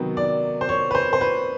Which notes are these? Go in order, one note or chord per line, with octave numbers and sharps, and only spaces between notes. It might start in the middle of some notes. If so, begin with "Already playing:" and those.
Already playing: C3 D#3 F#3 B3
D5
C5
C#5
B4
C5
C5
B4